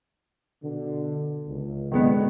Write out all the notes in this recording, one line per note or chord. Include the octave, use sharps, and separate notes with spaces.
B2 D3
C#2
B2 D3 D#3 G#3 B3